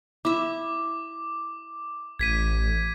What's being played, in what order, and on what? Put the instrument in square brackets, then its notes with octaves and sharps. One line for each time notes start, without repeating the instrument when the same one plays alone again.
[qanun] E4 E5 [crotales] D6
[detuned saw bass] A1 [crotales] G#6 B6 D#7